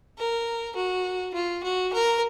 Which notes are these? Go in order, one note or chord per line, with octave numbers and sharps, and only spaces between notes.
A#4
F#4
F4
F#4
A#4